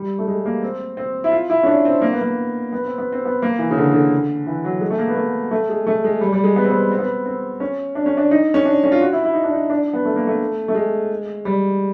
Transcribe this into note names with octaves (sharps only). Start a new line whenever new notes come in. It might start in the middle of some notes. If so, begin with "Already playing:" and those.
Already playing: G3
A3
G#3
A#3
C4
C4
E4
F4
E4
C#4
D4
C4
A#3
B3
A#3
B3
C4
B3
C4
B3
A#3
E3
C#3
D3
D3
E3
F#3
G#3
A3
A#3
B3
A3
A3
G#3
A3
G#3
G3
G3
G#3
B3
C4
B3
C4
B3
C4
C4
C#4
D4
C#4
D4
D#4
C#4
D4
C#4
F4
F#4
E4
E4
D#4
D4
D#4
D4
B3
A3
A#3
A3
A3
G#3
G3